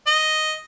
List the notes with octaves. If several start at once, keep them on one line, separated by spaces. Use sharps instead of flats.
D#5